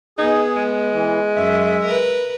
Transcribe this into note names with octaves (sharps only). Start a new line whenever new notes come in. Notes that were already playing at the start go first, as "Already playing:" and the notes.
B3 D#4 G#4
G#3
E3
F#2 E5
A#4 B4